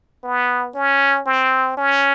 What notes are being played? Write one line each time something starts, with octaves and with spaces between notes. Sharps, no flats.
B3
C#4
C4
C#4